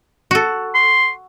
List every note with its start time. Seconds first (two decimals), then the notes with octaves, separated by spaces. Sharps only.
0.31 F#4 A4
0.75 C6